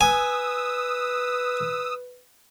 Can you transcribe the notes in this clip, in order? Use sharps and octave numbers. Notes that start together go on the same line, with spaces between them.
B4 G#5 D#6 E6